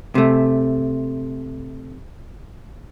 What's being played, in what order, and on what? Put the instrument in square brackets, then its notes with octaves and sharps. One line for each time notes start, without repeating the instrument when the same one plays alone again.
[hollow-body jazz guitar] C3 A3